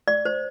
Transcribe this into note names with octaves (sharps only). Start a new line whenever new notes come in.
D5
C5